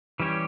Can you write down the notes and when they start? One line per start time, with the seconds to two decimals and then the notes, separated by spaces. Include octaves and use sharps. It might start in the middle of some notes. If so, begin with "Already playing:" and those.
0.20 E3 G3 C#4 G4 C#5